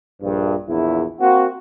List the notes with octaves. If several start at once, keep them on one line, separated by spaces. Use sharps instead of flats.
A#1 G2
A#1 E2 E4
A#3 C4 F#4